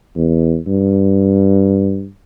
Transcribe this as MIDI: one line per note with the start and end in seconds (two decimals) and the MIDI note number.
0.16 0.58 40
0.67 2.07 43